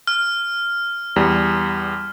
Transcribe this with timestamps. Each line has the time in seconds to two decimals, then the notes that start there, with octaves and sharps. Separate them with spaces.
0.07 F6
1.16 E2 G3